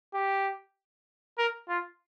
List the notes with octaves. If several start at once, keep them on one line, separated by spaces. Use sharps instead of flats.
G4
A#4
F4